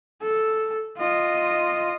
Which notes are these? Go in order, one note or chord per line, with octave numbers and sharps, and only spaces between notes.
A4
F4 D#5